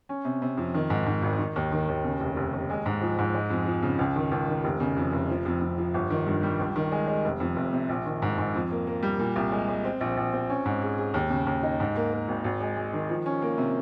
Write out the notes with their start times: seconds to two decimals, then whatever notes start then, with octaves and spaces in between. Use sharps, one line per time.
0.09 C#4
0.25 C3
0.42 C3
0.58 F2
0.74 D#3
0.90 G#2
1.06 G#2
1.22 G#1
1.39 D#3
1.56 D#2
1.72 D#3
1.88 D#2
2.04 C#3
2.20 F1
2.36 F1
2.53 D#2
2.70 G#3
2.86 G#2
3.02 F3
3.18 G#2
3.34 G#3
3.50 F2
3.66 F3
3.83 C#3
3.99 C#2
4.16 D#3
4.32 C#2
4.48 D#3
4.64 F1
4.80 C#3
4.97 F2
5.13 F1
5.29 F3
5.45 F2
5.62 F2
5.78 F3
5.94 G1
6.10 D#3
6.27 G2
6.43 G3
6.59 C#2
6.76 D#3
6.92 G#3
7.07 G#3
7.25 F1
7.40 F2
7.56 F1
7.73 C3
7.89 A#1
8.06 D#3
8.22 G#2
8.38 G#2
8.55 F2
8.71 A#3
8.87 A#3
9.03 G3
9.19 A#2
9.36 C2
9.52 G#3
9.69 G#3
9.84 C4
10.01 A#1
10.17 A#1
10.32 C4
10.50 C#4
10.65 G#2
10.82 G#4
10.98 G#4
11.14 D#2
11.30 C#3
11.47 D#2
11.63 D#4
11.80 G#2
11.96 A#3
12.12 A#3
12.28 G#1
12.44 G#1
12.60 G#3
12.77 G#3
12.93 D#3
13.09 F3
13.26 C#4
13.42 A#3
13.58 C3